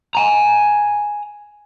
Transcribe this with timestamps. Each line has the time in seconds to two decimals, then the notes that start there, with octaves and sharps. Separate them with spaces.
0.15 G#5 A#5